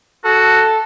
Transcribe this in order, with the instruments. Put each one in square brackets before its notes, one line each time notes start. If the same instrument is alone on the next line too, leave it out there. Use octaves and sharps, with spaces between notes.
[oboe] F#4 [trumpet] A4